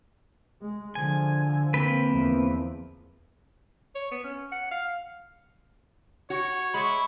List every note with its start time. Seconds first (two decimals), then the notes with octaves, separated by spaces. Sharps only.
0.62 G#3
0.95 D3 F3 G#5
1.74 A#3 C4 B4
2.09 E2 F3
3.95 C#5
4.12 B3
4.24 C#4
4.52 F#5
4.71 F5
6.30 F#4 C#5
6.74 G#3 E5 B5 C#6